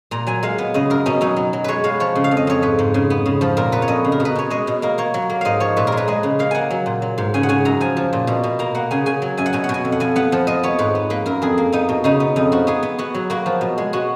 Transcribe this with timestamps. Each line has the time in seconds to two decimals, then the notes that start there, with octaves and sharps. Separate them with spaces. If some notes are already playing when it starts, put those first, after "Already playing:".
0.11 A#2 A#5
0.27 F#3 G#5
0.43 G#3 F5
0.58 B3
0.74 C#3 D#5
0.90 F#2 A#4
1.06 B2 C#4
1.21 F#3 D#4
1.36 F#3
1.53 F#3
1.64 G#3 B4 C#5
1.84 G#3 F5
2.00 F3 C#5
2.15 C#3
2.24 F5
2.31 F2
2.37 D#5
2.47 F2 C#5
2.62 G#2 B4
2.79 G#2
2.94 C#3
3.10 B3
3.26 C#3
3.41 F3
3.57 A#2 A#4
3.72 B3 B4
3.82 C#5
3.88 F2 D#5
4.04 C#3
4.12 A#4
4.20 B2
4.25 B4
4.35 B2 C#5
4.50 G#3 D#5
4.67 B2
4.82 A#3 A#4
4.98 A#3 C#5
5.14 F#3
5.30 A#3
5.41 G#2 D#5 F5
5.60 F3 C#5
5.77 A#2 B4
5.87 A#4
5.92 G#3
5.97 B4
6.08 G#3 D#5
6.23 C#3
6.39 A#3 F5
6.51 A#3 F#5 G#5
6.70 F#3
6.86 A#2
7.02 F#3
7.18 G#2
7.34 C#3 G#5
7.43 F#5
7.49 C#3 G#5
7.65 F#2 A#5
7.80 F3 G#5
7.97 F3
8.13 A#2
8.27 B2
8.44 B2
8.59 A#3 A#5
8.75 A#3 F#5
8.91 C#3 G#5
9.06 C#3 G#5
9.22 F#3
9.37 F#2 G#5
9.46 F#5
9.53 B2 G#5
9.64 F#5
9.69 B2
9.74 G#5
9.85 F2
9.92 F#5
10.00 F2 G#5
10.16 B3 F#5
10.32 F3
10.47 F3 D#5
10.63 B3 C#5
10.79 G#2 B4
10.95 B3
11.10 A#3 B4
11.26 F#2 A#4
11.42 F2 G#4
11.58 A#3
11.72 B3 D#4
11.89 B2
12.04 C#3 D#4
12.20 B3
12.36 F2 D#4
12.52 F3 F#4
12.67 B3 G#4
12.83 B3
12.99 B3 F#4
13.14 F#3
13.30 A#3 F#4
13.46 F3
13.61 B2
13.78 G#3
13.93 B3 F#4